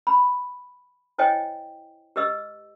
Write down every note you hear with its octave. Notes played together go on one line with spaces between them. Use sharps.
B5
E4 C5 C#5 D#5 G5 G#5
G4 B4 D#5 E6